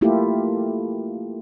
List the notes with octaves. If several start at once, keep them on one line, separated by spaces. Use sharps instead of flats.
A3 A#3 E4 F4 G4 A4